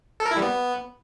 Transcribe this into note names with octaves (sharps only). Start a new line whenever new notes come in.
A4
A#4
E4
G3
B3